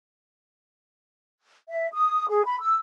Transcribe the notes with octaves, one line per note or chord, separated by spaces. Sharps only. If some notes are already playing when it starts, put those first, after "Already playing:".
E5
D#6
G#4
B5
E6